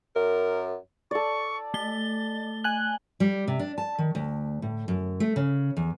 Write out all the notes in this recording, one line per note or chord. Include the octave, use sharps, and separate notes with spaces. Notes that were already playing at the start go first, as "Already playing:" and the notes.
F#2 A#4
A4 D5 C#6
A3 A6 G7
G#5 F#6
G3
C3
D4
A5
D#3
D2
A2
F#2
A3
C#3
E2